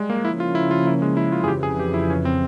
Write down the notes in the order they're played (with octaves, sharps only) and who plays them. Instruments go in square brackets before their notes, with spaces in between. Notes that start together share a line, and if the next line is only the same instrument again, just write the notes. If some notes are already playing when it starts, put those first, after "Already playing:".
Already playing: [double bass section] G3 [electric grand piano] G#3
[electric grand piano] A#3
[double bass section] C#3 F3 A#3 C#4 [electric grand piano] E4
[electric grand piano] F4
E4
F4
E4
G#3
E4
F4
G#4
[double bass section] F2 C#3 E3 [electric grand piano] G4
[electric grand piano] G#4
G4
E4
C#4
C4